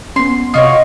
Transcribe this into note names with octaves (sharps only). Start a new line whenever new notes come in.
B3 C#4 C6
C3 F4 F#4 C#5 D#5 D#6